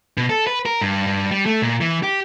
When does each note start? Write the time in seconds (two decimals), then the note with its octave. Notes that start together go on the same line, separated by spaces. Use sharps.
0.17 B2
0.29 A4
0.47 B4
0.66 A#4
0.81 G2
1.07 G2
1.31 G3
1.46 A3
1.62 A#2
1.81 E3
2.03 G4